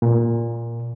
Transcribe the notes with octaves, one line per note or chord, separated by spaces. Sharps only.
A#2